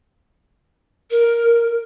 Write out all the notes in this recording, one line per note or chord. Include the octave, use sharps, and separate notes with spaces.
A#4